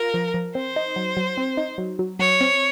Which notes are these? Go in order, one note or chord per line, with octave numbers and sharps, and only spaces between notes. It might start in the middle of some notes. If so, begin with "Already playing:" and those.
Already playing: F4 A#4
F3
F3
C4 C5
D#4
F#3
F#3
C4
D#4
F#3
F#3
F#3 C#5
C4